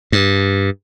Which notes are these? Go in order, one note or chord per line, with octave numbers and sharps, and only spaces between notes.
G2